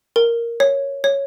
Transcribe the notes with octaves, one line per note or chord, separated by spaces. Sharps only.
A#4
C#5
C#5